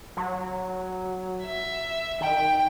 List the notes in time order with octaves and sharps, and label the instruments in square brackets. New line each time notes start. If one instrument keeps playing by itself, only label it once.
[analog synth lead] F#3
[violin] E5
[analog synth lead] D#3 [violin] G5